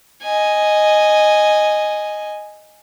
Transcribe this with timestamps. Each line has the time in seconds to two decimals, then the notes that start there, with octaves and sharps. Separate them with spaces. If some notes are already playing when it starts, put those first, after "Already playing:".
0.23 D#5 G#5